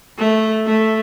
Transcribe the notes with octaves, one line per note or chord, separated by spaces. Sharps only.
A3
A3